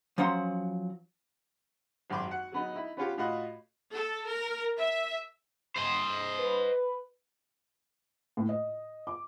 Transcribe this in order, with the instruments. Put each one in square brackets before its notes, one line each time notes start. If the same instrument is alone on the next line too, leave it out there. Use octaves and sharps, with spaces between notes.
[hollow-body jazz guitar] F3 F#3 C#4 F#5 A#5 C6
[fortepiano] G#1 F#2 G5 C6 D6
F#4 F#5
F#3 B3 D#4
D#4 E4
B3 C#4 F4 G4
A2 F4 F#4 D#5 F#6
[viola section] A4
A#4
E5
[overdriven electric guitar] C5 D#5
[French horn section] B4
[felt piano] A2
D#5
D6